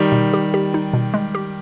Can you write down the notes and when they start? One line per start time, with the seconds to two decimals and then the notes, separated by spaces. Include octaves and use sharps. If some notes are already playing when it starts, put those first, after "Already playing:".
Already playing: D#3 G3
0.12 B2
0.34 G4
0.54 G4
0.74 D#4
0.93 B2
1.14 G#3
1.35 G4